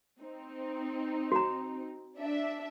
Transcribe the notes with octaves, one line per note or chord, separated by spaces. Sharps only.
C4 D#4
F#4 A#5
D4 E5